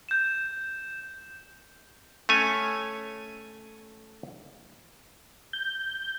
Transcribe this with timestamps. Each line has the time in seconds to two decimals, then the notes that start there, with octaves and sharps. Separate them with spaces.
0.09 G6 E7
2.29 A3 C#4 C#5 G#5
5.53 G6